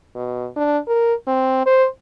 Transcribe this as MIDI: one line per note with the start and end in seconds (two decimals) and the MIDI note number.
0.15 0.48 47
0.56 0.78 62
0.88 1.14 70
1.27 1.64 60
1.66 1.87 72